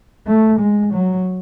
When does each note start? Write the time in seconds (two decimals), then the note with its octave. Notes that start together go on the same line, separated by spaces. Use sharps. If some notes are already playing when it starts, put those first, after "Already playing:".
0.26 A3
0.59 G#3
0.93 F#3